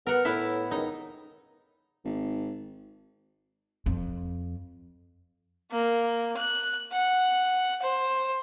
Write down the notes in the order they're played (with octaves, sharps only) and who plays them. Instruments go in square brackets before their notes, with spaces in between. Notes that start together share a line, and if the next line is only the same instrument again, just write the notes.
[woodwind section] B3 [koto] A#4 F#5
[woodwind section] A2 [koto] B3 E4 E5
[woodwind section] C#2 D#3 [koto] D#4
[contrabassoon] G#1
[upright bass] F2
[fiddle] A#3
F#6
F#5
C5